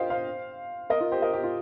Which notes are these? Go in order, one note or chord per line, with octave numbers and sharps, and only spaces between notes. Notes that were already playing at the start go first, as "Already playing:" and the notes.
Already playing: F4 G4 A#4 C5 D#5 F5 G5
C5 F5
A#4 D#5
F4 A#4
G4 C5
A#4 D#5
G4
F4